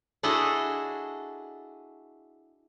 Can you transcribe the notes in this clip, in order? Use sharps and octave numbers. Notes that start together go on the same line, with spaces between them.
D4 E4 F#4 G#4 A4 D#5